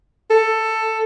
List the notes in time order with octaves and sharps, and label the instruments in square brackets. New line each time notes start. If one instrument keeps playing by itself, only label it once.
[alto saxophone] A4